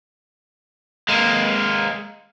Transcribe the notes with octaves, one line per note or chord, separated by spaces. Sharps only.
G#3 A#3